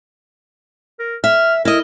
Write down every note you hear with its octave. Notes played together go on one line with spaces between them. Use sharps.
A#4
E5 F6
E4 A#4 D#5